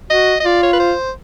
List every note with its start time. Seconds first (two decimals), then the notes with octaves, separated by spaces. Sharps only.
0.10 F#4 D#5
0.40 D#5
0.45 F4 D5
0.63 C#5
0.73 B4
0.80 C5